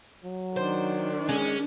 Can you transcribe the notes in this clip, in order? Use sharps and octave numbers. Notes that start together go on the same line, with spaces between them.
F#3
D#3 D4 C5
G#3 C#4